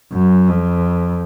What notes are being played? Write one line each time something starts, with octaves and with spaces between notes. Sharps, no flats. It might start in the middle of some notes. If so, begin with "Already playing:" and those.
F#2
F2